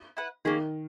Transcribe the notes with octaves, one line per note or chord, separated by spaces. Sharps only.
E4 B4 F#5
D#3 A#3 C#4 G#4